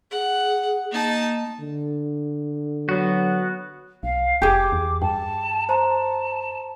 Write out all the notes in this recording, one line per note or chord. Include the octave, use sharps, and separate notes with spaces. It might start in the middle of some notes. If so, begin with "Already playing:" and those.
G#4 F#5
A#3 D#4 A5
D3
F#3 B3 F#4
B1 F5
F1 G4 G#4 D6
D6
E2
G2 G5 A5
C5 A5 A#5 C6